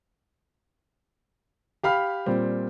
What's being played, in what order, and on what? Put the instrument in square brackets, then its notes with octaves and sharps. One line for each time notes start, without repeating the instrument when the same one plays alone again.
[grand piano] G4 F5 B5 F6
A#2 G3 C4